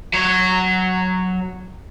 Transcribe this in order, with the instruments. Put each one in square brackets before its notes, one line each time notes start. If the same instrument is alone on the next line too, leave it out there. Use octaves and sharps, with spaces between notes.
[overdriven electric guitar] F#3 C#5